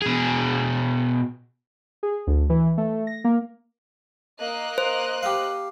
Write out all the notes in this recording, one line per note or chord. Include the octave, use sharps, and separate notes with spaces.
B2 G#4
G#4
D2
E3
A3
A#6
A#3
A#3 D#5 F#6
C5
G4 F5